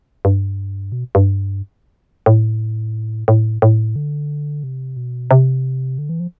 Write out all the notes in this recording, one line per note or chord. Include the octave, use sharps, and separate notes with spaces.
G2
B2
G2
A2
A2
A2
D3
C3
B2
C3
D3
E3
F3